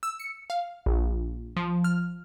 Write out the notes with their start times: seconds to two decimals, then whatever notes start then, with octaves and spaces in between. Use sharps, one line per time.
0.03 E6
0.19 C#7
0.50 F5
0.86 A#1
1.56 F3
1.84 F6